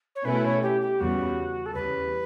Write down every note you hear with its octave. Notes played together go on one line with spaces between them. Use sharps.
C#5
B2 A3 C#4 E4 B4
C#5
G4
G4
E2 C#3 G3 B3 F#4
A4
E2 C#3 G3 B4